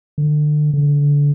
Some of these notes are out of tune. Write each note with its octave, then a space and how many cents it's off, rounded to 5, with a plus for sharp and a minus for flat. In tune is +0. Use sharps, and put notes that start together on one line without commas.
D3 +30
D3 -25